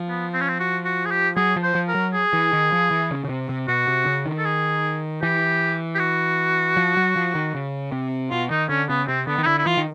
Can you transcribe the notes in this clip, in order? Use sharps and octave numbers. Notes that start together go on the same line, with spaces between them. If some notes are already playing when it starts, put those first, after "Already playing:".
Already playing: F3
B3
C4
C#4
C4
F#4
F#4
G#4
G4
F#3 G#4
F3
C5
F3
A#4
F#3
G#4
E3
D#3
F3
E3
C#3
C#3
C3
C3
B2 F#4
C3
C#3
D#3
A4
G#4
E3 G4
G4
F#4
F3
F#3
F3
D#3
C#3
C3
B2 F4
D#3 D#4
D3 C#4
C#3 B3
C3 C4
D3 B3
D#3
D#4
D3 E4
E4
E3 F4
D#3